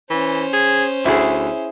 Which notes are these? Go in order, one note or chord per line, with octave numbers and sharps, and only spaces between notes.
E3 C#4 C5
G#4
D2 E4 G#4